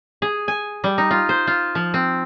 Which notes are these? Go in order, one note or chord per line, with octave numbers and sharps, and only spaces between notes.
G#4
G#5
G3
D#4
F4
C5
F4
F3
C4